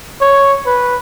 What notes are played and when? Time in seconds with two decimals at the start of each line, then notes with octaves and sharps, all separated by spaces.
0.21 C#5
0.66 B4